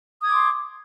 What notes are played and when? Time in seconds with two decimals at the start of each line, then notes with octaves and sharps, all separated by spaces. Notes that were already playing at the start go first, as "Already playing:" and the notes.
0.21 D#6
0.25 G#6
0.29 D6
0.33 C6